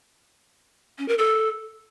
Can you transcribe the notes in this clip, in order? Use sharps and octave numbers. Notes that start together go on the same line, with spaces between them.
C#4
A#4
A4